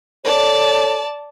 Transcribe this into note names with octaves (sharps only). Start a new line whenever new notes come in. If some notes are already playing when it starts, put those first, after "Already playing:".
A4 C#5 D5 A5